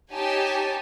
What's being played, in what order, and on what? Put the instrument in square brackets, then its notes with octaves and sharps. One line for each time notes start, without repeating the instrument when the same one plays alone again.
[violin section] D#4 G4 C#5 G#5 A5